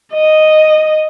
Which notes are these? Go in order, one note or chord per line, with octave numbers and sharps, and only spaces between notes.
D#5